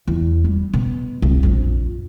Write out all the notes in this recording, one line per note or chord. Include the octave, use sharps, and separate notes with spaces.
E2
G3
B2
C2
A#1 F2